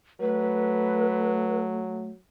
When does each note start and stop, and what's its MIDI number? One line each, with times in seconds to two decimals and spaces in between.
0.20 2.19 54
0.20 2.08 57
0.20 1.58 71